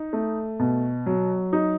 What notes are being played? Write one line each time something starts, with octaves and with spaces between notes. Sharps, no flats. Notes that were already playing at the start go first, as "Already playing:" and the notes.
Already playing: D#4
A3
B2
F#3
D#4